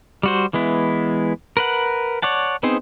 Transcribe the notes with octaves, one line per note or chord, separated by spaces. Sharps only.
G3 F#4 C5
E3 G#3 B3 E4
A#4 B4 F#5
C#5 D5 F#5 A5
B3 C4 D#4 G#4 C5